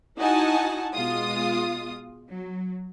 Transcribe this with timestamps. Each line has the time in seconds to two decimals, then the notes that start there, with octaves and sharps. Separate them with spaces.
0.18 D#4 E4 F#4 F#5 G#5 A5
0.93 B2 G#3 F4 D#6
2.28 F#3